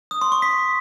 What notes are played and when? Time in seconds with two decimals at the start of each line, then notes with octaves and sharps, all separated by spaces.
0.11 D#6
0.21 C6
0.32 C#6
0.42 B6